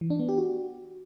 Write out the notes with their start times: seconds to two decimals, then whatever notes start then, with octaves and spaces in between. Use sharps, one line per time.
0.01 E3
0.10 D4
0.19 B3
0.29 G4
0.38 F#4